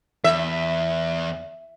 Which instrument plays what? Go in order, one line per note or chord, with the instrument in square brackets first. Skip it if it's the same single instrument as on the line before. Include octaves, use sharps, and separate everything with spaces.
[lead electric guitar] E2 [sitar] E5